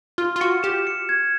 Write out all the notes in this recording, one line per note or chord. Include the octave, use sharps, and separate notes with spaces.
F4 F6
F4
F#4 C#7
G4 E7
C#7
G#6